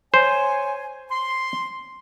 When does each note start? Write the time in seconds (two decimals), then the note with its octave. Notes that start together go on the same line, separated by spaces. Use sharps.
0.14 C5 C#5 G#5
1.09 C6